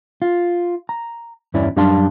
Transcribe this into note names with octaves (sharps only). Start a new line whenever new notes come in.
F4
A#5
E2 G2 E3 C#4 E4 D5
F#2 G3 D4 F5 A5 C6